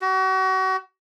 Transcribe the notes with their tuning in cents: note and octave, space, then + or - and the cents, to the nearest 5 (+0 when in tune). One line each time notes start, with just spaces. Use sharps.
F#4 +35